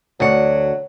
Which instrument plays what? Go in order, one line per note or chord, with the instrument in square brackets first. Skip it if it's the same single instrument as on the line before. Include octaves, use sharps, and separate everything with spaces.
[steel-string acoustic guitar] D2 F#5 [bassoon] F#3